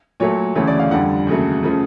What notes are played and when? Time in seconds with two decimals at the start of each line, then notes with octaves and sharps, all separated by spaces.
0.20 A#2 F#3 A3 C#5
0.55 D2 C#3 E3 A3 C#5
0.67 D5
0.79 F5
0.91 F2 D3 G3 F#5
1.27 D#2 C#3 F#3 A3
1.63 C#3 F3 A3